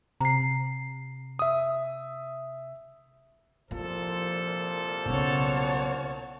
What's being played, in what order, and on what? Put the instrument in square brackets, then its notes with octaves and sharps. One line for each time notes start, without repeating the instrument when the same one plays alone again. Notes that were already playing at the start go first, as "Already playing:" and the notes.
[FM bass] C3 [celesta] A#5 C7
[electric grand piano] E5 D#6
[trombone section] C2 A#2 C5 [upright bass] F3 [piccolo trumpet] A4
[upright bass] B1 C#3 [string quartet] C#5 F#5 A5